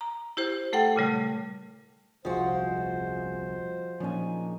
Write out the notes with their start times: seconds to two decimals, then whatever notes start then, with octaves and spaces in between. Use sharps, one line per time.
0.01 A#5
0.37 E4 G4 C5
0.73 A3 A4 F#5 G5
0.96 A#2 C#3 G3 A3
2.25 D#1 C2 F3 G#3 F4 F#4 C5
4.00 A#2 F3 C#4 D#4 G#5